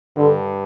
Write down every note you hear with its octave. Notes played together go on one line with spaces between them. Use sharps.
G2 D3